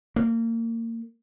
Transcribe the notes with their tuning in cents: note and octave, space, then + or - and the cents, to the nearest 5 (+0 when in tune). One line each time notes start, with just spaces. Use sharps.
A#3 -30